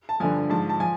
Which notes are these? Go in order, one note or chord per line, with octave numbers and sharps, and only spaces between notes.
A5
G2 D3 F3 G#5
G#2 F3 A5
A5
F3 G#5